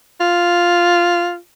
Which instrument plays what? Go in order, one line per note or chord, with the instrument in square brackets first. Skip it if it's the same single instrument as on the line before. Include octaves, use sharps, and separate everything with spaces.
[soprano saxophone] F4